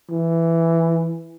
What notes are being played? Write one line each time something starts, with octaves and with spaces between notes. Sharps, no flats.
E3